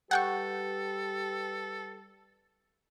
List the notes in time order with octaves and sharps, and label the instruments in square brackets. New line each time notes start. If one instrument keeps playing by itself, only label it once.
[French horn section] G3 G4 B4 [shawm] A4 [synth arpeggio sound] F#5 G5 C#6